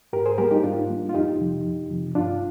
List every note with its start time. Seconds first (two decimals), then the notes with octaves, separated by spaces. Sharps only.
0.13 G#2 G4 A#4
0.26 G#4 C5
0.38 G3 A#3 G4 A#4
0.51 D#4 G4
0.63 G#2 D4 F4
0.89 G3 A#3
1.09 F4
1.14 F2 D#4 G4
1.40 C3 F3
1.65 F2
1.90 C3 F3
2.15 G2 D4 F4